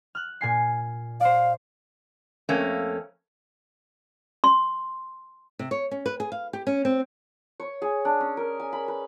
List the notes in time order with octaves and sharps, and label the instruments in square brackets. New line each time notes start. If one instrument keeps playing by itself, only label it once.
[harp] F6 F#6
A#2 G#5 C7
[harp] C5 D5 [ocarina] F5
[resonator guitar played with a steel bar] F2 A3 A#3 C#4
[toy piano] C6
[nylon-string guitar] C3
C#5
C#4
B4
G#4
F5
G4
C#4
C4
[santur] C#5
G#4
D4
C#4
A#4
G#5
B5
B4